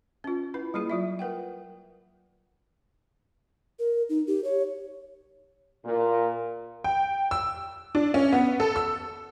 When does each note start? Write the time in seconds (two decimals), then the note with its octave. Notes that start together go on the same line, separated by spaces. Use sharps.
0.24 C#4 F4
0.54 E4 B4
0.74 G3 A#3 E4 G#4
0.90 F#3 F4 E5
1.19 A#4 B4 F#5 G5
3.79 A#4
4.09 D#4
4.27 G4
4.44 C#5
5.85 A#2
6.84 G5
7.31 E6
7.95 D4
8.14 C#4
8.32 B3
8.60 A4
8.76 E6